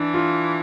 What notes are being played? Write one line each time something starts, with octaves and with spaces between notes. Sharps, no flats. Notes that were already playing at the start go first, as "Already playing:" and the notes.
Already playing: E3 D4
F4